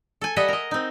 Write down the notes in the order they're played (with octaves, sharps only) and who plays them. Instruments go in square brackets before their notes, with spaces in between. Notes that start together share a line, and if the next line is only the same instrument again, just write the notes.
[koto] A4 G#5
G3 D#5 E5 F#5 G#5
A#4 D#5
C4 D#4